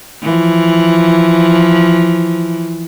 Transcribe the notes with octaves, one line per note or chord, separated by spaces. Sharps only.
E3 F3